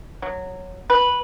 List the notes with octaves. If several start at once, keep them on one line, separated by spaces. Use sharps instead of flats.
F#3
B4